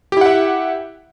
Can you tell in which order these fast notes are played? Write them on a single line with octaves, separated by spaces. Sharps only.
G4 E4 F#5 E5